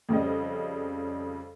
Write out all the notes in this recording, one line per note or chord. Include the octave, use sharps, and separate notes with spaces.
F2 C#3 G3 D#5